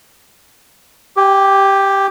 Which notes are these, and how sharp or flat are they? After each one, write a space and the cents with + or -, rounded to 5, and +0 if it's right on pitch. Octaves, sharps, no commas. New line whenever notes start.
G4 +0 G#5 -40